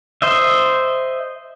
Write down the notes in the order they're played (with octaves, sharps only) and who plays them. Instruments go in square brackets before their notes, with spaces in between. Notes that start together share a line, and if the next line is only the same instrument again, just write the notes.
[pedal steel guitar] C5 D#5 E5